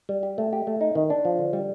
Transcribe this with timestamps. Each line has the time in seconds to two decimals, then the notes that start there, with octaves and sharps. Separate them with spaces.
0.09 G3
0.23 G4
0.38 A3
0.53 G4
0.67 A3
0.81 D#4
0.95 D#3
1.10 D4
1.25 F3
1.39 D3
1.53 G3